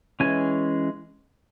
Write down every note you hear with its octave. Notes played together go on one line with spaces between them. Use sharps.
E3 G#3 C#4 G#5